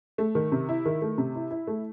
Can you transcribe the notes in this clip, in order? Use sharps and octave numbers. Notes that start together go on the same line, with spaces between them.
A3
D#3
C3
E4
D#3
A3
C3
E4
E4
A3